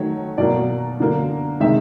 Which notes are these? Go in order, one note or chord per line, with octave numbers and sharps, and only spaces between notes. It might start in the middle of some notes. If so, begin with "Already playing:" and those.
Already playing: D#3 F#3 A3 C#5
B2 F#3 A#3 D5
D3 F#3 A#3
C3 D#3 G#3 E5